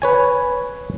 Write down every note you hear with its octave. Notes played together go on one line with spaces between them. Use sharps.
B4 C#5 G#5